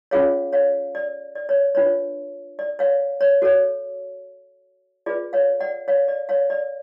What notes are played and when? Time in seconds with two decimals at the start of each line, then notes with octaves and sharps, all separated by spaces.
0.11 C#4 F4 G#4 C#5 F5
0.53 C#5 F5
0.95 D5
1.35 D5
1.49 C#5
1.75 D4 F4 B4 C#5
2.59 D5
2.79 C#5 F5
3.21 C#5
3.42 F#4 A4 C#5
5.06 F4 G#4 B4 D5
5.33 C#5 F5
5.60 D5 F#5
5.88 C#5 F5
6.08 D5
6.29 C#5 F5
6.50 D5